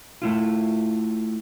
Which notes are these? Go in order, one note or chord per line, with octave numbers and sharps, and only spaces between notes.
A3 E4 F4